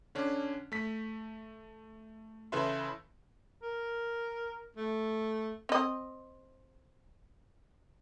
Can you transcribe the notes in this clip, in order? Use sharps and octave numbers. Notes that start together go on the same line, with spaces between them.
D3 C#4 D4
A3 B6
C#3 E3 A4 B4 E5 C6
A#4
A3
C4 D#5